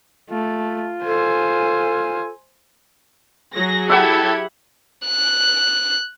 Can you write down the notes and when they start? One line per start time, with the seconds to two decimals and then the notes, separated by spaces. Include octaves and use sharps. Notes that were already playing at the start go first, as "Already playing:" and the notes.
0.31 A3 F4
1.05 A4 C5 G#5
3.54 F#3 G#4 A#6
3.90 E4 G4 A4 E5 F#5 G#6
5.07 F#6